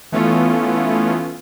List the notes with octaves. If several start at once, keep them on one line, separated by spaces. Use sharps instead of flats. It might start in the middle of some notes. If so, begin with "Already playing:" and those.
E3 A3 B3 C#4 F4